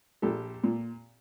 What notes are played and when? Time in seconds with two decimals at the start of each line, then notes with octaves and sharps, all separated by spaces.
0.22 A#1 A#2 G4 A4
0.64 A#2